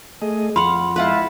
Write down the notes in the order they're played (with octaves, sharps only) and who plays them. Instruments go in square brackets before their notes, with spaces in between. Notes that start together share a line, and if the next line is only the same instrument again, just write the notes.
[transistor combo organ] A3 G#4 D#5
[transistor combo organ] F2 [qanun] F5 F#5 [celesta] B5 C6
[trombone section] G#3 E4 F4 [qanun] B4 F#5 A5